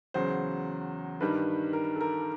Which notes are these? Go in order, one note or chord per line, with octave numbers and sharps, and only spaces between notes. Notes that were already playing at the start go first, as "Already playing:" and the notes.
E2 C#3 F#3 C5
G2 D#3 G3 B4
A#4
A4
A#4